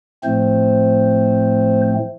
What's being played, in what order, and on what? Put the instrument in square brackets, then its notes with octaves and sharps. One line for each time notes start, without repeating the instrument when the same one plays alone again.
[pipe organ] A2 F3 A3 C4 C5